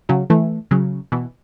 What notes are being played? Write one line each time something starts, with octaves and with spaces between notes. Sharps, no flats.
C#3 F#3
E3 A3
C#3 F#3
B2 E3